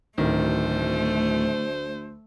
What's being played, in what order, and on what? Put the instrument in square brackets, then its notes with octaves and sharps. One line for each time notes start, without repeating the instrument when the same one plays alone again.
[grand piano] D1 D#3 [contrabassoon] D2 [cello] A3 [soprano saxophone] C5